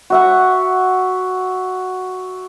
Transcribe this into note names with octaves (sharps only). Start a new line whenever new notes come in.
F#4 E5 F#5